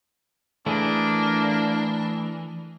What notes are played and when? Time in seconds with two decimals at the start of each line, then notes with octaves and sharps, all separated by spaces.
0.66 E3 A3 A#3 D4 G#4